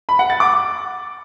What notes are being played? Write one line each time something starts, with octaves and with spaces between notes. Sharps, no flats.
B5
F#5
A6
D6